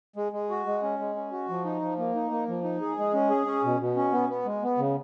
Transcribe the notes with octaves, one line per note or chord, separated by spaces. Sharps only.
G#3
G#3
F#4
G#3
C#4
G#3
C#4
F#4
F3
D#4
F3
A#3
D#4
A#3
F3
D#4
G#4
G#3
C#4
G#4
C#4
B2
B2
C#4
B3
B3
G#3
B3
C#3